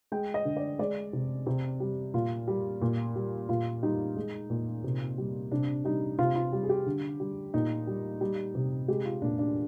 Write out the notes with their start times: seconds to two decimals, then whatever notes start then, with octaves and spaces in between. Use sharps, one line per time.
0.12 G#3 G5
0.34 D#5
0.45 D3
0.57 D5
0.79 G#3 D5
1.13 C3
1.46 C3
1.80 G3
2.14 A#2 F4
2.48 G3
2.82 A#2
3.16 G3
3.49 A#2 F4
3.83 G3 D#4
4.16 G#3
4.50 A#2
4.84 C3
5.18 G3
5.52 C3 D4
5.85 G3 D#4
6.19 C3 F4
6.35 F4
6.53 G3
6.63 G#4
6.69 G4
6.86 D3
7.20 G3
7.54 A#2 D#4
7.87 G3
8.21 G3
8.55 C3
8.88 G#3 G4
9.05 F4
9.22 A#2 D4
9.39 D4